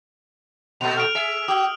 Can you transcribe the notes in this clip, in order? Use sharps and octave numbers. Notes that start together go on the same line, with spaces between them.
A#2 A3 F7
F6 D7 F7
G#4 E5
F#4 D#6 E6